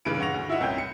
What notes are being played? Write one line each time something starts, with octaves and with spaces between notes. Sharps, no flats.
G2 C#3 E3 B4 D7
C#3 F#5 C#6 A#6 F7
D2
E4 F4 D#5 E5 F#5
C2 C#4 G5 G6
C#7